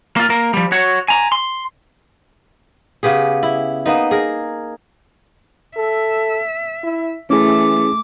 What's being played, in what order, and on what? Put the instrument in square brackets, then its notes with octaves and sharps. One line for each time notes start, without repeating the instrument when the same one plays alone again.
[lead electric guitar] A#3 F4
A#3 A#4
F3 G3
F#4 C#5
G#5 A#5
C6
[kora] C#3 B3 G4 G#4
E4
A#3 B3 D#4
G#4 A#4
[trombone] A4 [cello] E5
[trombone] E4
[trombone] E3 [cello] A3 [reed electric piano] C#4 E4 G#4 [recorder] D6